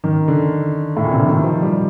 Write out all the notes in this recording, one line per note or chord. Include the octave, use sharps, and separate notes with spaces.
D#3
D3
A2
A#2
C3
D3
D#3
F3
G3